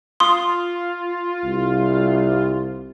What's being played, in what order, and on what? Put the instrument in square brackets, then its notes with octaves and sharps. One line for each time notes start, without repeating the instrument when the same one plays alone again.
[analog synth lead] F4 [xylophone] C6 D#6
[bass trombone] C2